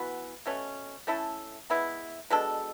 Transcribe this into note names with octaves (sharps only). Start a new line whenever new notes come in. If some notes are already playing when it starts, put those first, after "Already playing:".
Already playing: E3 B3 F#4 B4
B2 A3 C#4
A3 C#4 E4 A4
G#3 B3 E4
B2 G#3 D4 A4